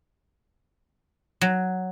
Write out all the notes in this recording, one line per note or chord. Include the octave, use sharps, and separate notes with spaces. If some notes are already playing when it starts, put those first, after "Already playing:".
F#3